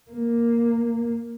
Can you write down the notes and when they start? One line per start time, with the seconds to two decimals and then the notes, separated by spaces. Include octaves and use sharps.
0.11 A#3